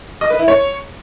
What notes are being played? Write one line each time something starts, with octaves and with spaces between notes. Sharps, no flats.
D#5
B4
E4
C#5